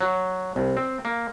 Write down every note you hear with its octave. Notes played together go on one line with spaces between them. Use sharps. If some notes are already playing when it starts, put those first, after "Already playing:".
F#3
C2
C4
A#3